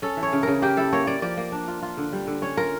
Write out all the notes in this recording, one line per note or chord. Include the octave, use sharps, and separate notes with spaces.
C#4 A4
E3
C#5
C#3
C#3 A#4
A#3 G4
E4 A4
A#3 C#5
A#3 D5
F3 D5
A#3
D4
F4
F4
D3
G3
D3
C#4 C#5
F4 A#4